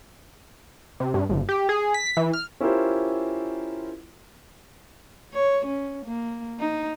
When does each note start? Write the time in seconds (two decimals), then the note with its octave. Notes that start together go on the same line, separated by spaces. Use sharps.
1.00 C3
1.14 G2
1.30 G1
1.49 G4
1.69 G#4
1.94 B6
2.17 E3
2.33 F6
2.60 C#4 E4 F4 G4 A#4 C5
5.33 C#5
5.65 C#4
6.05 A#3
6.59 D#4